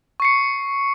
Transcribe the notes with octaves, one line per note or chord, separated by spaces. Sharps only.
C#6 C7 C#7